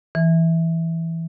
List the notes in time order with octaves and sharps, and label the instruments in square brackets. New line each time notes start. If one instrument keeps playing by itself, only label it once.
[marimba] E3